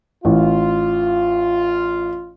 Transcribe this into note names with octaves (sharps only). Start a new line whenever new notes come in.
A1 F4